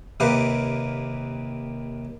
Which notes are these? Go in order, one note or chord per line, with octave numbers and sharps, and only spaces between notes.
D#2 C3 A#3 G4 B4 F5